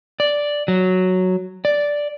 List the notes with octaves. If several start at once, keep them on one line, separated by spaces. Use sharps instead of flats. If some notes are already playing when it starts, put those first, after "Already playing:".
D5
F#3
D5